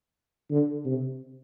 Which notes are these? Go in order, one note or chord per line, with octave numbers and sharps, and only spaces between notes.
D3
C3